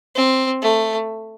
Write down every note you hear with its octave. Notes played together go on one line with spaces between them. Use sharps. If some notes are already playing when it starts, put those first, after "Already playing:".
C4
A3